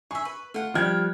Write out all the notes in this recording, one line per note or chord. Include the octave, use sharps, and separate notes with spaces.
G#4 E5 C#6
B4
A3 F4 F#5
F3 G3 G5 F6 F#6 G#6